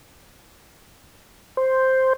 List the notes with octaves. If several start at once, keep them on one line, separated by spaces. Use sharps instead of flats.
C5